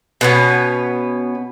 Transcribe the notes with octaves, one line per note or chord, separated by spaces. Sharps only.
B2 B3 C#4